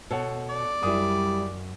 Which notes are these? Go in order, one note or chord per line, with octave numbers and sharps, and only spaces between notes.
B2 A4 C#5 F#5
D5
F#2 G3 E4 D#6